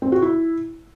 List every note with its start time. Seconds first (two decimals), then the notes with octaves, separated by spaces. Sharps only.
0.02 C4
0.12 F#4
0.22 E4